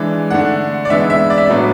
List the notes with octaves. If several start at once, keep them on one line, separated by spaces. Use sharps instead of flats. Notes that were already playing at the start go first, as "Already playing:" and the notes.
Already playing: E3 G#3 D4
D3 A3 D4 F#5
D5
E3 G#3 B3 D4 E5
E5
D5
E5
A2 F#3 B3 D4 D5